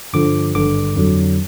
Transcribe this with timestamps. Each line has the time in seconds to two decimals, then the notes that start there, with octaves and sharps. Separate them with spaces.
0.13 G2 D3 F3 D6
0.55 G#1 G2 D3 D6
0.95 F2 D3 F#3